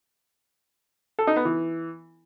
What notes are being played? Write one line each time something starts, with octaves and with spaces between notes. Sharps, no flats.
A4
D#4
B3
E3